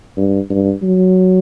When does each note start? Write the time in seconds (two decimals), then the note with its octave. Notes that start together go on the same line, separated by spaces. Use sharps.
0.17 G2
0.50 G2
0.82 F#3